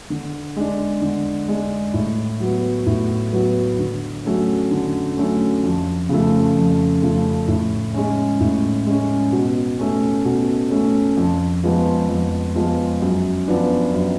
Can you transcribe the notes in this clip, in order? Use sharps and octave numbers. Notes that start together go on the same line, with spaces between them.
D3
G#3 D4
D3
G#3 D4
A2
F#3 B3
A2
F#3 B3
D3
F#3 A3 C#4
D3
F#3 A3 C#4
F2
C#3 F3 A3
F2
C#3 F3 A3
A2
G#3 C#4
A2
G#3 C#4
B2
A3 C#4
B2
A3 C#4
F2
F3 G#3 B3
F2
F3 G#3 B3
F#2
F3 B3 D4
F#2